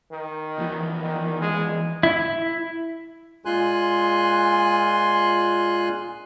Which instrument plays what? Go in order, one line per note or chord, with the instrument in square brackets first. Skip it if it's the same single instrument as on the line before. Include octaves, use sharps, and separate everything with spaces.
[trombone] D#3
[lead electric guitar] D#2 E3
[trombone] D#3
G#3
[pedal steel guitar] E4
[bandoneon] A#2 G#3 F4 G#5 C6 F#6